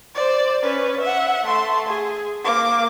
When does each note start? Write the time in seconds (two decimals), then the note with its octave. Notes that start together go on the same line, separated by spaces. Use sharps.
0.15 C5 D5
0.63 C#4 B4
1.01 E5 F#5
1.46 A3 C6
1.87 G#4
2.45 A#3 D6